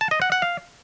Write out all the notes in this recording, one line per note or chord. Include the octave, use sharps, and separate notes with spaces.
A5
D#5
F#5
F#5
F5